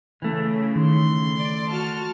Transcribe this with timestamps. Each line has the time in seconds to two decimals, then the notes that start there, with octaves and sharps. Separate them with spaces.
0.22 C#3 E3 A3
0.76 D#3 C6
1.35 D5
1.69 F#4 A5 F6